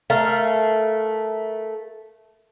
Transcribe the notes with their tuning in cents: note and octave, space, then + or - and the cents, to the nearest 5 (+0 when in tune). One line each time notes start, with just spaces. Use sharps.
A3 -10 A#4 +0 F5 -20